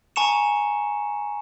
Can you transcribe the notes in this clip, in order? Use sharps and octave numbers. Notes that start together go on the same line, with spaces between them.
G#5 A#5 C#6 C#7 E7